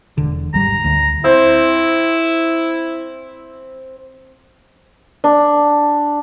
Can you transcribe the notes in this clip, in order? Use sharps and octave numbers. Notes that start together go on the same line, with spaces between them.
E1 D3
G#1 G3 A#5
D2
C4 E4
D4